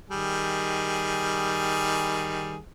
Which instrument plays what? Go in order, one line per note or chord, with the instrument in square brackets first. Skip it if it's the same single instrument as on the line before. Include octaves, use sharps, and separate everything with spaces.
[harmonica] D#3 G3 G#4